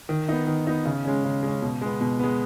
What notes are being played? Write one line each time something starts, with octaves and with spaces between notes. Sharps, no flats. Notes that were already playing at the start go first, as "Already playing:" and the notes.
D#3
B3 D#4
D#3
B3 D#4
C#3
G#3 C#4
C#3
G#3 C#4
B2
G#3 B3
B2
G#3 B3